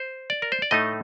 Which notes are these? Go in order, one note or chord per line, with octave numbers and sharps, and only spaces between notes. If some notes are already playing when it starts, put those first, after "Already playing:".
Already playing: C5
D5
A#4
C5
D5
A2 A3 D#4 D#5